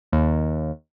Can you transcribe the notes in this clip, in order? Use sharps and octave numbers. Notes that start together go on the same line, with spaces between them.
D#2